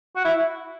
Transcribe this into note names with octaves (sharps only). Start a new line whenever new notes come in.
F#4
E4